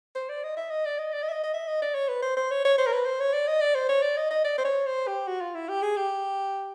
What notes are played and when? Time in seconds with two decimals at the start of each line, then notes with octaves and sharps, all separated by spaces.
0.15 C5
0.29 D5
0.43 D#5
0.57 E5
0.70 D#5
0.85 D5
0.98 D#5
1.12 D5
1.22 D#5
1.29 E5
1.33 D#5
1.43 D#5
1.54 E5
1.67 D#5
1.82 D5
1.95 C#5
2.08 B4
2.22 C5
2.37 C5
2.51 C#5
2.65 C#5
2.78 C5
2.86 A#4
2.92 B4
3.06 C5
3.20 C#5
3.34 D5
3.47 D#5
3.61 D5
3.75 C5
3.89 C#5
4.03 D5
4.17 D#5
4.30 D#5
4.44 D5
4.58 C5
4.64 C#5
4.86 C5
5.07 G4
5.27 F#4
5.41 F4
5.54 E4
5.69 G4
5.82 G#4
5.96 G4